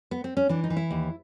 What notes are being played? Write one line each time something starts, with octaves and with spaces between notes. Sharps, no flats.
B3
C4
C#4
E3 D4
D#4
E3
E4
D#2